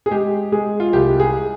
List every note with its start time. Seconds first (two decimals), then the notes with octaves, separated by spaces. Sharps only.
0.06 G#4
0.11 G#3 G4
0.52 G#3 G#4
0.80 F4
0.93 C2 G4
1.20 G#4